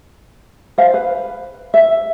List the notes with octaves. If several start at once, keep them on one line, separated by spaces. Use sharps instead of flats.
C5 F5
B4
E5